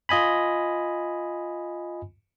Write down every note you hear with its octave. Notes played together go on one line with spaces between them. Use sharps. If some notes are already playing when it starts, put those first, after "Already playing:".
F4 D#5 G#5 B5